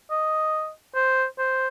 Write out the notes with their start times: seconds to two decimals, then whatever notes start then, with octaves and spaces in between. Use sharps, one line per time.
0.11 D#5
0.95 C5
1.38 C5